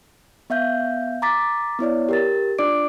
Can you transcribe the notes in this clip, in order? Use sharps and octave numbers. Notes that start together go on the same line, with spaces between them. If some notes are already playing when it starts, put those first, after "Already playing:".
B3 E5 F5 G6
A#5 D6 A6 B6
B3 E4 C#5 D5
G4 A#4 A6
D4 F4 D5 D6 D7